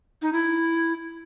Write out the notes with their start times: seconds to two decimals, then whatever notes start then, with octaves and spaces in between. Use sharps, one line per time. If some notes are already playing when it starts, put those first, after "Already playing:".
0.22 D#4
0.33 E4